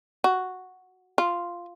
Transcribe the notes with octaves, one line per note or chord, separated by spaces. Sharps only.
F#4
F4